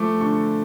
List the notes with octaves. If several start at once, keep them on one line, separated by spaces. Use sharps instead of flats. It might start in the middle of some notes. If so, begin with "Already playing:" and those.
Already playing: F3 A3 D6
D3 C#6